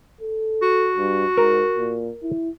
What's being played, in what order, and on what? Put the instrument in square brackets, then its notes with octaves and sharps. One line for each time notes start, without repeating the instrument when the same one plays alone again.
[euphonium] A4
[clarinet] F#4
[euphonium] G2
[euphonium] G#2 [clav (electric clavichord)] A#4
[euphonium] A#2
E4